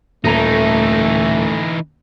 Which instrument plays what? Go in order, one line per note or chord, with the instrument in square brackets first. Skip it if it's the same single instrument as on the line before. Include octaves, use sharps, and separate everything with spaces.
[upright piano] D#1 A#5 F7 [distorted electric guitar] E3 D#4 [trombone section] A3